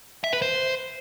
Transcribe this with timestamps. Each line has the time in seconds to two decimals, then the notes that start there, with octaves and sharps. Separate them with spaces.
0.24 E5
0.33 B4
0.42 C5